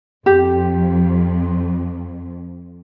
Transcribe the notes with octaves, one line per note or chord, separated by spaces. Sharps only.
F2 G4